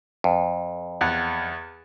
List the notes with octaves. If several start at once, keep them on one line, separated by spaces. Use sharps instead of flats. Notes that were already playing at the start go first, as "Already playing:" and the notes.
F2
E2 F#5